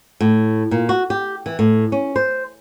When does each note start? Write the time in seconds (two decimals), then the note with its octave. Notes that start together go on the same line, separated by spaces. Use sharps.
0.21 A2
0.71 A#2
0.89 F#4
1.10 G4
1.46 E3
1.59 A2
1.92 C#4
2.16 C5